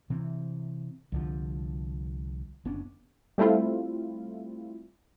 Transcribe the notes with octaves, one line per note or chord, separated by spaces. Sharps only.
C3 E3 C4
C2 D3 F3
F#1 B3 C#4 D4
G3 A3 C4 E4 F4